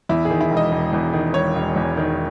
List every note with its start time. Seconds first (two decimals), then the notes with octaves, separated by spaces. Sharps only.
0.09 E2 E4
0.25 G#4
0.30 D#3
0.41 E4
0.51 E1
0.57 D#5
0.72 E1
0.93 E2
1.13 D#3
1.34 E1 C#5
1.55 E1
1.76 E2
1.97 D#3